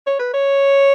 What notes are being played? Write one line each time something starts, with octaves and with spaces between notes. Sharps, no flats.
C#5
B4
C#5